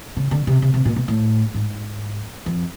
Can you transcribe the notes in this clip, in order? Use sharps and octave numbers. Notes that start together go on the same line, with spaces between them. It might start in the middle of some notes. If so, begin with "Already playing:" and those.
C#3
D3
C3
C3
C3
A#2
B2
A2
G#2
F2